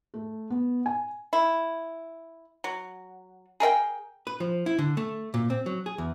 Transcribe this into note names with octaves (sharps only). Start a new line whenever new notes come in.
A3
B3
G#5
E4
F#3
G#4 A#4 E5 G5
B4
F3
E4
D3
A3
A#2
C4
F#3
G#4
E2